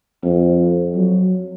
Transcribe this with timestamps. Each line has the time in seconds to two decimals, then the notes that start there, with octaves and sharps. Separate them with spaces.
0.24 F2
0.96 F#3